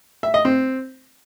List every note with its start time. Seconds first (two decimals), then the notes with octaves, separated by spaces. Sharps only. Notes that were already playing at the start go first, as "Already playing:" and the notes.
0.23 E5
0.34 D#5
0.45 C4